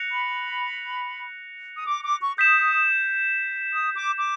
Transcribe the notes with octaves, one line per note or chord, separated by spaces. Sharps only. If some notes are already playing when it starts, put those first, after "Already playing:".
Already playing: F#6 A#6 C#7 F7
B5
D#6
D6
D6
C#6
D#6 G6 B6 E7
D#6
D6
D6